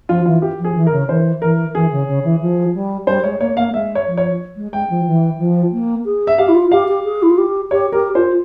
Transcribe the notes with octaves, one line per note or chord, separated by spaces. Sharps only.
F3 F4
E3 F4
G4
F3
G#4
E3
A#4
C#3
E3 C5
E3 A#4
E3 G#4
C#3
C#3
E3
F3
G3
G3 C5
G#3 C#5
A#3 C#5
A#3 F5
G#3 E5
C#5
F3
C#5
G#3
G#3 G5
F3
E3
F3
A#3
G#4
E5
G4 F5
E4
F4
G4 F5
G4
G#4
E4
F4
G4
G4 C#5
G4 A#4
F4 C5